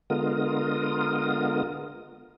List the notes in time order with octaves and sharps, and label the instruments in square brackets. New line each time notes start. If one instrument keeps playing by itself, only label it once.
[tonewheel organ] D3 G#3 B3 F4 A#4 D#6